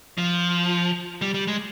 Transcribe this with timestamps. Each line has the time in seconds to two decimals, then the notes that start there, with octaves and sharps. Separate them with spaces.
0.18 F3
1.21 G3
1.34 G3
1.47 G#3